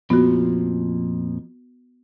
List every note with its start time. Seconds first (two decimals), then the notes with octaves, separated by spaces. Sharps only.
0.10 F2 A#2 F3 B3 F#4